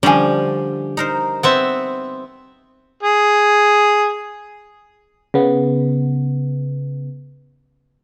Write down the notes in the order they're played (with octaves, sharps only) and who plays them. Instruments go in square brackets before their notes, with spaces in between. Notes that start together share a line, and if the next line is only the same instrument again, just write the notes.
[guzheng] D3 F3 [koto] G3 [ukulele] C#4 D4 G#5
[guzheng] D#4 A#4 C5
[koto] B3 C4 E5
[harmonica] G#4
[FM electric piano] C#3 B3